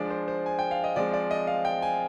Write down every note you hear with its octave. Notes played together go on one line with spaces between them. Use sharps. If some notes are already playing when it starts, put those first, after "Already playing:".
Already playing: F3 G#3 D4 D5
C5
C5
G#5
G5
F5
D#5
F3 G#3 C4 D5
D5
D#5
F5
G5
G#5